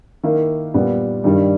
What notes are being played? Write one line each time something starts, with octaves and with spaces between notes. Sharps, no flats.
D#3 A#3 E4
A#2 G3 B3
G2 D#3 G3